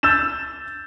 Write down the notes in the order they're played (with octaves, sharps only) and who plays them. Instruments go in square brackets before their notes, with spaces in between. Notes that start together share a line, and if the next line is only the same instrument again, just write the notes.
[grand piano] E6 G6 A6 E7